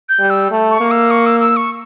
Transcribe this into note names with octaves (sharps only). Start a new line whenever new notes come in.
G6
G3
E6
A3
C#6
A#3
E6
C#6
E6
E6
C#6